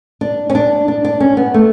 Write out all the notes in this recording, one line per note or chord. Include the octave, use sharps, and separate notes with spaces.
D4
C#4
D4
D4
D4
C#4
B3
A3